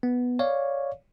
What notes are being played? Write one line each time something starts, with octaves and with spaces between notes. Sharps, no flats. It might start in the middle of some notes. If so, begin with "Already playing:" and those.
B3
C#5 D5 F5